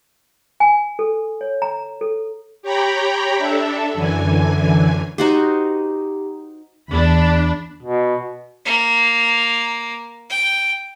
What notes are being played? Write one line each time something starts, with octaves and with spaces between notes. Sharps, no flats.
G#5
A4
C#5
A#5
A4
G4 C#5 G5 A#5 B5
D4 A4 E5
F#2 D3 E3 G#5
D#4 F#4 G4 C5 A#5
E2 D4 B5
B2
A#3
G5